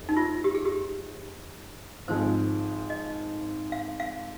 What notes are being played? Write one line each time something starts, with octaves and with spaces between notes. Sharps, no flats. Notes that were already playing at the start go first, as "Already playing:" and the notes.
Already playing: F1
D#4
F4
G4
G#4
G4
G#1 G#2 F3 G#3 C5
D#5
F5
F5